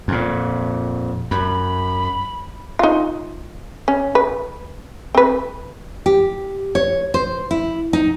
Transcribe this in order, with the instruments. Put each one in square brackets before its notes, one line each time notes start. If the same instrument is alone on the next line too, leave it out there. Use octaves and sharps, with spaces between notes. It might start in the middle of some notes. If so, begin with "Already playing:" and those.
[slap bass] F2 A#2
[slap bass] F#2 [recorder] B5
[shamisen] D#4 F4
C#4
B4
C4 B4
[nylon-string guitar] G4
C#5
C5
E4
D#4